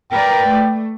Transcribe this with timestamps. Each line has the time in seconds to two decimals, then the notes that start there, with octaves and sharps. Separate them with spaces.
0.12 A#4 B4 D5 G5
0.49 A3